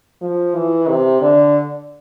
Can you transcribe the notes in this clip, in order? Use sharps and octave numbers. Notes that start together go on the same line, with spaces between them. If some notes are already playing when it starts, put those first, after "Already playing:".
F3
E3
C3
D3